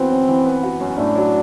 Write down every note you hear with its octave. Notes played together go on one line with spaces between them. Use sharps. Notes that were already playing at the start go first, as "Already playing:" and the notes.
Already playing: E3 B3 C4 F#4
F#2
E3
B3
F#4
F#2
A2 D4
F#3